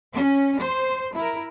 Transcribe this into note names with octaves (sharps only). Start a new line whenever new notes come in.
C#4
C5
E4 A#4